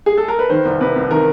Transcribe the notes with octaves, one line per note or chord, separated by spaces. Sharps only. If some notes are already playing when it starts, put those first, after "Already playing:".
G#4
A4
A#4
B4
D#3 C5
C2
C3 B4
C2
D#3 A#4